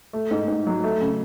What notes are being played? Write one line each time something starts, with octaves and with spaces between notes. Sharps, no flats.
A3
G#2
G#2
F#3
A3
C#3